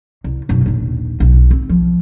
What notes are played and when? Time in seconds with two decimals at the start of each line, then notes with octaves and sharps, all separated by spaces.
0.24 C2
0.49 B1 F#2
0.66 A#1 D#2
1.20 B1
1.51 C4
1.69 F3